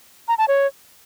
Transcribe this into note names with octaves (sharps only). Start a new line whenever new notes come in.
A#5
A5
C#5